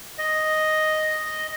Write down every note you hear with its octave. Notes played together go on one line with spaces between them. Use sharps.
D#5